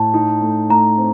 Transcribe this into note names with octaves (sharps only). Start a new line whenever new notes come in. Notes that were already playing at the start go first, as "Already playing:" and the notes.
Already playing: A2 A5
D#4
A3
A3 A#5
C4